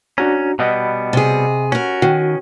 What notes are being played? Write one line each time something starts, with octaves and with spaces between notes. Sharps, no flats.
C#4 D4 F#4 A#5
B2 G3 B3 D#5 F#5 B5
C3 G#4
C#4 F#4 A#4
D#3 F#4